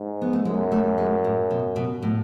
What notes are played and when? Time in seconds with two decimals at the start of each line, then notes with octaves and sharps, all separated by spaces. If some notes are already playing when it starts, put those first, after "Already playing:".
Already playing: G#2
0.22 B3
0.33 A3
0.45 F#2 G#3
0.72 A3
0.98 G#3
1.24 A2
1.51 B2
1.76 B2
2.03 A2